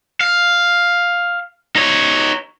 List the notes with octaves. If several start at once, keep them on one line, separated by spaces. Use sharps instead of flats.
F5
D#4 C#5